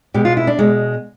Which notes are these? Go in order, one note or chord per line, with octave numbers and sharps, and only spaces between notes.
B2 G#3 G4
F4
E4
D4
B2 G#3